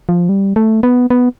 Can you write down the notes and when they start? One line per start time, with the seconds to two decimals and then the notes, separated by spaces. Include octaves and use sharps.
0.09 F3
0.29 G3
0.56 A3
0.83 B3
1.10 B3